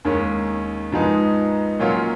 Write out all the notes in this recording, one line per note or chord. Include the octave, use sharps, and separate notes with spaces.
D#2 D#3 G#3 C#4
G#2 F3 G#3 B3 D#4
A#2 F#3 C#4 F4